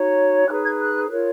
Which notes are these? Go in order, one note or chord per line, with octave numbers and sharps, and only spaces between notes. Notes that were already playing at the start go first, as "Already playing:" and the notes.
Already playing: D#4 F#4 C#5
D#4 G#4 B4 F#6
G#6
F#6
F4 A#4 C#5